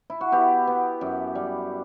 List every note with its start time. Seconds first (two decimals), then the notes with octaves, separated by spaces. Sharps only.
0.10 E4
0.21 F#4
0.32 B3 E4 G4
0.67 B3
1.01 F#2
1.35 G3